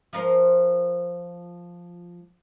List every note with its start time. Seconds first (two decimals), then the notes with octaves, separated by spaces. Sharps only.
0.13 F3 A#4 C5